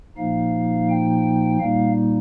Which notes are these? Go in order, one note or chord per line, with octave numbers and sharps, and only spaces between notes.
A#2 F3 A#3 D#4 F5
G5
A#2 G3 A#3 D#4 F5